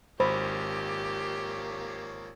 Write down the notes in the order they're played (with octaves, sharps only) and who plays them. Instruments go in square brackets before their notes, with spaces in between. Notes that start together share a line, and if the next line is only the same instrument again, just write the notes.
[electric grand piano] G#1 [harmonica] F3 A#3 C#5 [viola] G4 [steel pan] C5 B5